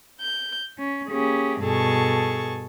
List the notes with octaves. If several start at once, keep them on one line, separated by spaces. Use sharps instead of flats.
G6
C#4
A#3 C#4 G4 G#4
G2 B2 G#4 A4 A5 C#6